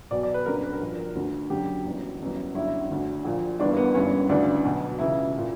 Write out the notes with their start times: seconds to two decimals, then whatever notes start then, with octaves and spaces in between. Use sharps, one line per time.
0.11 B1 B2 D5
0.23 D5
0.34 B4
0.46 G1 F#2 D3 A#4
0.63 B4
0.73 A#4
0.80 A#1 A#2
1.15 D2 D3
1.50 F#1 F#2 D3 G4
1.85 G1 F#2 E3
2.21 G1 F#2 E3
2.55 G1 F#2 D3 E4
2.90 D2 D3
3.24 A#1 A#2
3.60 G1 G2 E3 D4
3.71 A#3
3.77 B3
3.94 G1 G2 E3 C#4
4.29 D2 C#3 E3 D4
4.65 B1 B2
4.99 C#2 C#3 E3 E4
5.38 A#2